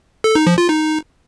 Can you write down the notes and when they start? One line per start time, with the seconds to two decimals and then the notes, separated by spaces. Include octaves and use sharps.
0.24 A4
0.35 D#4
0.47 F3
0.58 F4
0.69 D#4